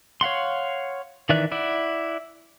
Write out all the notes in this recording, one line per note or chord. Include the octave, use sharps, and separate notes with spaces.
C#5 F5 F#5 C6
D#3 E3 D5 E5 F#6
E4 D5 E5 F#5